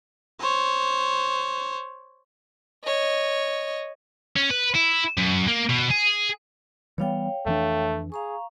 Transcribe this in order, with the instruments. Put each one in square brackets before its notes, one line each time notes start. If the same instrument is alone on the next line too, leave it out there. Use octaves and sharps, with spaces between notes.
[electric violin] C5 C#5
[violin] C#5 D#5
[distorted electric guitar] C#4
B4
E4
F#2
A#3
B2
G#4
[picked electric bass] E3 G3 B3 [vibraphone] C#5 F5 G5
[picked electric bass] F2 E3 D4 [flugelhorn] A3
[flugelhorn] G#4 [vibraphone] F5 A#5 C#6